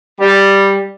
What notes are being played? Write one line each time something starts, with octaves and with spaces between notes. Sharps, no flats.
G3